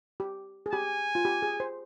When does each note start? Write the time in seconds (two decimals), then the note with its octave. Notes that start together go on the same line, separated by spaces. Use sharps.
0.20 G4
0.66 G#4
0.72 G4 G#5
1.15 F4
1.25 G4
1.42 G#4
1.60 C5